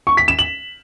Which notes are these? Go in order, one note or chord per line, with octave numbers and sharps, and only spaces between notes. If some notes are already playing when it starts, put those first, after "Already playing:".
C#6
B6
E7
F#7